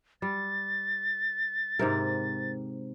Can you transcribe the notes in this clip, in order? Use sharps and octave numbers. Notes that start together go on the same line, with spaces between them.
G3 A6
G#2 C3 A#4